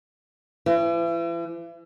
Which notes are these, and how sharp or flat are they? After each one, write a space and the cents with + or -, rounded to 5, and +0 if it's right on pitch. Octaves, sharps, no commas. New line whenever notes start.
E3 +40